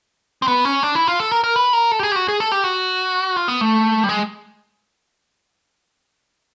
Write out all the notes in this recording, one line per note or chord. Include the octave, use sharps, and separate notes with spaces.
C4
B3
C#4
D4
E4
F4
A4
A#4
A#4
B4
A#4
A4
G4
G#4
G4
F#4
G#4
A4
G4
F#4
F4
B3
A3
G3
G#3